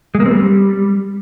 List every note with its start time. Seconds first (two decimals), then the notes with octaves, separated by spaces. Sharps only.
0.15 G#3
0.20 A#3
0.25 C4
0.31 G3